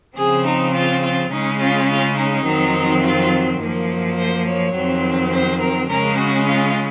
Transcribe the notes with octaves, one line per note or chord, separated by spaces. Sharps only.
C#3 F3 C4 G#4
D#4
F4
F4
C#3 G#3 C#4 D#4
F4
F4
D#4
F2 D#3 F#3 C4
F4
F#2 F3 A#3
C5
C#5
F2 D#3 F#3 C4
C5
A#4
C#3 G#3 C#4 A#4
F#4
F4